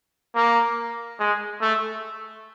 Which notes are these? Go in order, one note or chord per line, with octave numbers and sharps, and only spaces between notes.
A#3
G#3
A3